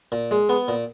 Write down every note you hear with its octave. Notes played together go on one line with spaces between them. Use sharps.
A#2
G#3
B3
A#2